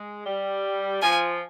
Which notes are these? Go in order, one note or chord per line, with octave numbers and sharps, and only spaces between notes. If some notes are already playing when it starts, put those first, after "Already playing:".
Already playing: G#3
G3
F3 G#5